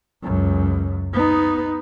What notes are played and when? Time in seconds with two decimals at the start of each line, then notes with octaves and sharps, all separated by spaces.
0.23 C#2 F#2
1.13 B3 D#4